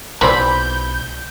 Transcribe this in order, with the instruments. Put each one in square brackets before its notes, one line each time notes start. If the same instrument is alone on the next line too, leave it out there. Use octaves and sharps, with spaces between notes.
[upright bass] B1 [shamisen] E3 C4 D5 [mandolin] B5 [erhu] G6